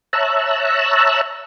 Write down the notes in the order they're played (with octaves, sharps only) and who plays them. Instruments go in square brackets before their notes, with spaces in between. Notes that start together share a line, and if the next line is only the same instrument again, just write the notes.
[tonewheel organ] C#5 E5 A5 A#5 E6 F#6